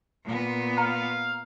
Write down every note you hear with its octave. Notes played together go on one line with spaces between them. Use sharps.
A#2 B3
F5 A#5